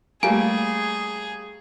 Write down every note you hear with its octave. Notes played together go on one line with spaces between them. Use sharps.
G3 A3 A#3 G#4 G#5